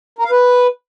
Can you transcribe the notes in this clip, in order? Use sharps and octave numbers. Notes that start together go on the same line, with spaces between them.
A#4
F5
B4